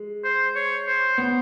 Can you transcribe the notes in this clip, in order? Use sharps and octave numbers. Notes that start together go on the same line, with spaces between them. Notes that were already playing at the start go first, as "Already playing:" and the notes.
Already playing: G#3
C5
C#5
C5
B3